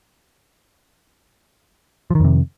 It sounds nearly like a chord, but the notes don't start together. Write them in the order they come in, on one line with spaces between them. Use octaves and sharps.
F3 D#3 F2 C3